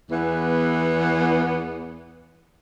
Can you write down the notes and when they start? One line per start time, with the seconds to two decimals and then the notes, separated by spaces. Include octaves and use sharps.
0.10 E2 E3 B3